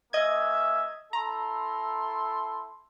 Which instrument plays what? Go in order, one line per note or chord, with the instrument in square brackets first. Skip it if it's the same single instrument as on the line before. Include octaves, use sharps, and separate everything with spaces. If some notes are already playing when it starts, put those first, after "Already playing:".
[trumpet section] A#3 C#4 E5 [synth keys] D#5 G#6
[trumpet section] E4 A4 C6 [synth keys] A#5